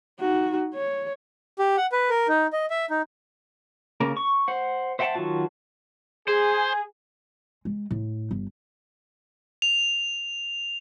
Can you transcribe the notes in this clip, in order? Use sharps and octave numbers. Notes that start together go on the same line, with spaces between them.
D#4 F#4
C#5
G4
F#5
B4
A#4
D#4
D#5
E5
D#4
C#3 A#3 A#4
C#6
C5 F#5
C5 E5 F#5 G5 A5
D#3 F#3 F4 F#4 A5
G#4 C5
G#3
A2
G1
F7